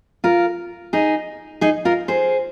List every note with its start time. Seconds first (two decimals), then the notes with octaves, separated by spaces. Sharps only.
0.24 F4 A#4
0.93 D#4 G#4
1.61 D#4 G#4
1.85 F4 A#4
2.08 G#4 C5